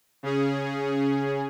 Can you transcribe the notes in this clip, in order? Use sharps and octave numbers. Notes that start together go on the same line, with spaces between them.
C#3 C#4 G#4